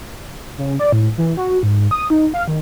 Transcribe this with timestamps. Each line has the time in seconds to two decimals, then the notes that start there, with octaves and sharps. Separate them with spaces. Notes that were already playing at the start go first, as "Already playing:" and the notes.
0.58 C#3
0.79 D5
0.92 A2
1.18 E3
1.37 F#4
1.63 G#2
1.91 D#6
2.10 D#4
2.34 F5
2.48 D#3